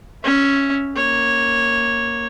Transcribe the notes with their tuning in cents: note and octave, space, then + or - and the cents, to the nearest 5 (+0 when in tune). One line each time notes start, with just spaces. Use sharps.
C#4 +0 E5 +0
A#3 +0 C#5 -10